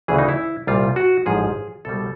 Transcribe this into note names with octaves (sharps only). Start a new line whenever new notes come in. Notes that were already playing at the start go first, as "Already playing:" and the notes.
D2 C#3 E3 G#4
D#4
E4
C2 A#2 G3 F4
F#4
A1 G#2 F3 G#4
C2 B2 G3 A4